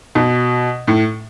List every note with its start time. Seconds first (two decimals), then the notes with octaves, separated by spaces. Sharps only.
0.15 B2
0.87 A2